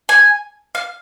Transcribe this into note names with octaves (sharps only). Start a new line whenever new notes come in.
G#5
F5